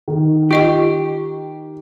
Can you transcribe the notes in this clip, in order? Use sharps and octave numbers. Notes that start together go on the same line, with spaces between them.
D#3
F4 G4 D#5 C#6